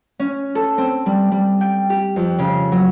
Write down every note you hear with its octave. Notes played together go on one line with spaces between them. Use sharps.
C#4
A4
C4
G3
G3
G5
G4
F2
C#3
F#3